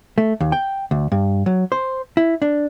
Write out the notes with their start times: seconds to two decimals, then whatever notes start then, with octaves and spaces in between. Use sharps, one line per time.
0.18 A3
0.40 D#2
0.52 G5
0.91 D2
1.12 G2
1.46 F#3
1.72 C5
2.17 E4
2.42 D4